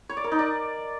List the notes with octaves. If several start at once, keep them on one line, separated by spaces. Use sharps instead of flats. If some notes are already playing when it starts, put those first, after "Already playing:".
C#5
D5
A#4
D#4
D5